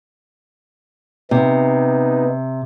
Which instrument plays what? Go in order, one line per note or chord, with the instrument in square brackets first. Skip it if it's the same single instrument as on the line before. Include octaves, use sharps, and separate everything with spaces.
[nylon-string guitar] C3 [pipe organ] B3 D#4